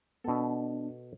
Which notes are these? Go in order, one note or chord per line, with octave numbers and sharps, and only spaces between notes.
B2 B3 D4 A4